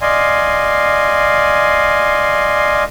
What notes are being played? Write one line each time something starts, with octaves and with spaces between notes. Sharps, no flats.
D5 D#5 F5 G#5 C6